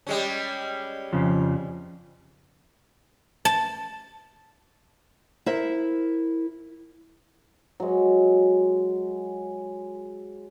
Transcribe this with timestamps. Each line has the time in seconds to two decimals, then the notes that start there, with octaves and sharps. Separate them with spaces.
0.07 G3 G#3 C#4
1.13 F2 C#3 F3
3.45 A5
5.46 E4 A#4 C5 E5
7.80 F#3 G#3